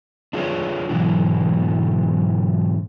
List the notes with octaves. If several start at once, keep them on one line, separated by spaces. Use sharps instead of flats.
D4 F4 G#4 A#4 C#5
G#2 B2 D3 E3 F#3